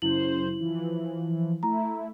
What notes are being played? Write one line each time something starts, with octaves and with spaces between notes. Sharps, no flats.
F#2 C#3 E4 C5 F#7
E3 F3
A3 E4 A#5